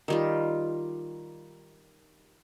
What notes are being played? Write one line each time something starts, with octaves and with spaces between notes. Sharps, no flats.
D#3 G3 F4